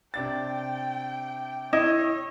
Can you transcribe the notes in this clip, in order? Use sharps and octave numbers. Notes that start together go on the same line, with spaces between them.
C3 D4 G5 A6
E4 C#5 D#5